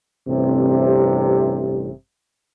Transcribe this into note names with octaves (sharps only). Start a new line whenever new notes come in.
A1 G2 C3